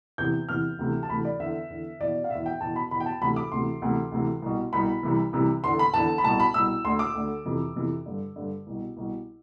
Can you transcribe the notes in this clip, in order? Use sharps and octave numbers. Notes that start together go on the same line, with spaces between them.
E2 C3 E3 G6
E2 C3 E3 F6
D2 C3 E3
A5
D2 C3 E3 B5
D5
E2 D3 E5
E2 D3
E2 B2 D5
F5
E2 B2 E5
G5
E2 B2 A5
B5
E2 B2 B5
G5
A5
D2 C3 E3 B5
D6
D2 C3 E3 C6
D2 C3 E3
D2 C3 E3
C2 B2
C2 B2 B5
C2 C3 E3
C2 C3 E3
E2 D3 C6
B5
E2 D3 A5
B5
C2 B2 A5
B5
C2 B2 E6
D2 D3 C6
D6
D2 D3
F2 C3 E3
F2 C3 E3
G2 D3
G2 D3
C2 B2
C2 B2